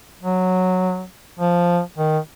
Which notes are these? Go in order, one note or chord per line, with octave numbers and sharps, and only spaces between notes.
F#3
F3
D#3